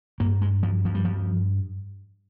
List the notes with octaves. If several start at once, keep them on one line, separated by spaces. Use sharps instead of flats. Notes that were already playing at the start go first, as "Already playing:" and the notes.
G2 A#3
G#3
F3
F3
G3
F3